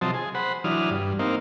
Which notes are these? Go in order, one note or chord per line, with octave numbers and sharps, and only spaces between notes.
C3 F3 F#3 C5 D#5 A5
G#4
C5 F#5 B5
E3 F#3 D4 D#6 F6
G2
A#3 C4 D#4 F5